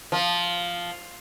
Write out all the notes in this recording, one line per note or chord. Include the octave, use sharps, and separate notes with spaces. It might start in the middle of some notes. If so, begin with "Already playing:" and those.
F3